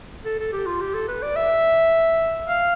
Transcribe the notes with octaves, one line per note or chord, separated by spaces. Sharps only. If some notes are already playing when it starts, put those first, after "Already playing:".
A4
A4
G4
F4
G4
A4
B4
D5
E5
F5